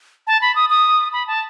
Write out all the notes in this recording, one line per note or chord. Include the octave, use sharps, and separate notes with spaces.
A5
B5
D#6
D#6
B5
A5